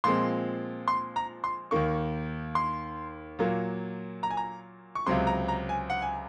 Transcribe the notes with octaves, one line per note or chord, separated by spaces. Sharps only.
A#2 F3 G#3 C4 C6
C6
A#5
C6
D#2 D#3 A#3 C#6
C6
A#2 F#3 A#3
A#5
G#5
A#5
C#6
C#2 C3 F#3 C4 C6
A#5
A#5
G#5
F#5
G#5